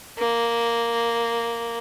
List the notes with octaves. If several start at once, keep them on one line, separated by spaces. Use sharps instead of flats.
A#3